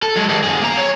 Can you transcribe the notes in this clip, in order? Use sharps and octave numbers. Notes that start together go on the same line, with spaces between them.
A4
F#3 G#3
D#3 G#3
F#2 G#4
A#3 A#5
C#5